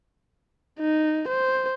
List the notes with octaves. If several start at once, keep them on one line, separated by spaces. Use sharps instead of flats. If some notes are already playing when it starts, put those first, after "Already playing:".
D#4
C5